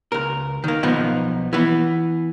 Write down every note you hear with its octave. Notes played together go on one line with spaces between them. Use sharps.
C#2 A#4
D#3 A#3
B1 F3 B3 D#4
E3 B3